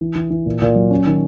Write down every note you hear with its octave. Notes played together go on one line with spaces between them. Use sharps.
E3
E3
E3
A#2
A#2
F#3
C#4
D#3